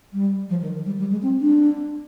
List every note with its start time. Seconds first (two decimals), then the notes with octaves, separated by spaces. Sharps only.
0.13 G3
0.50 F3
0.62 D#3
0.86 G3
0.99 G3
1.11 G#3
1.22 C4
1.41 D4